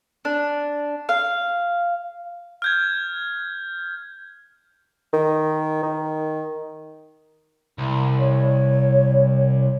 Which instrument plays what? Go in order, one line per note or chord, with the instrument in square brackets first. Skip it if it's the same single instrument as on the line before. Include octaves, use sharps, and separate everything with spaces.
[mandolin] D4
F5
[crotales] F6 G6 G#6
[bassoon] D#3
D#3
[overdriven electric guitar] C2
[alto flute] C#5